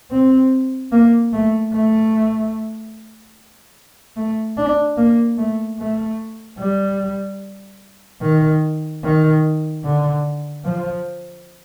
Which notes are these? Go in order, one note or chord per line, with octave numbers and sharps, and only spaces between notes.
C4
A#3
A3
A3
A3
D4
A#3
A3
A3
G3
D#3
D#3
D3
F3